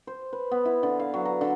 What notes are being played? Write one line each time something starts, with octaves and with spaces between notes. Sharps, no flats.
C5
B4
B3
E4
D3
F5
F#3
A#5
D3